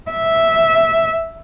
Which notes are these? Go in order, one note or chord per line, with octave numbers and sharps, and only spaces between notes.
E5